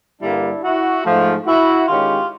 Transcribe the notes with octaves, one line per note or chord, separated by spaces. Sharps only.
G2 D3 G3 A#3 D4 E4
E4 F#4
G#2 F3 A3
E4 F#4
D#3 G#3 C#4 F4 G4